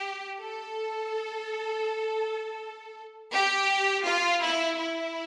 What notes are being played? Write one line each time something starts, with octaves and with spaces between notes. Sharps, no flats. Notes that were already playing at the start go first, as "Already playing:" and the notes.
Already playing: G4
A4
G4
F4
E4
E4